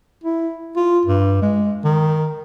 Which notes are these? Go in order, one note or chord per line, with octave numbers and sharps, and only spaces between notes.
E4
F4
G2
G#3
D#3